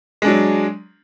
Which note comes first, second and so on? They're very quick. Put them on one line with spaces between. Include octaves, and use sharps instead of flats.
G#3 D4 F#3